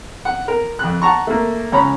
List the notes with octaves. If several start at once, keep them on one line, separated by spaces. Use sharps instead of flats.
F#5
A#4
F2 F#6
F#5 A5 A#5 C#6
A3 A#3
C#2 C#4 A#5 B5